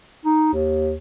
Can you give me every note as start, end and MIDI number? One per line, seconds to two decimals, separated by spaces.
0.25 0.51 63
0.53 0.95 39